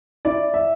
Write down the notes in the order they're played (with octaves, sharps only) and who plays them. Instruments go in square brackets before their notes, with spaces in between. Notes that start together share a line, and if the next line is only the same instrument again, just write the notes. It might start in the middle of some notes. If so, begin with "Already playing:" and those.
[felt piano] E4 [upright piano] D5
[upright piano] E5